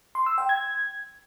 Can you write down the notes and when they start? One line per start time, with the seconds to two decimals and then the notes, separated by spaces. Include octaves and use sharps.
0.15 C6
0.26 E6
0.38 G5
0.49 G#6